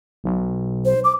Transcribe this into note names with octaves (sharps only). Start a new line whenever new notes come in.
B1
C5
D6